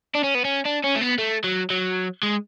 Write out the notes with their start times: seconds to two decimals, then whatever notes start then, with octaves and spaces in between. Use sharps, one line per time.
0.15 D4
0.24 C#4
0.35 B3
0.45 C#4
0.66 D4
0.84 C#4
0.95 A3
1.01 B3
1.19 A3
1.44 F#3
1.70 F#3
2.23 G#3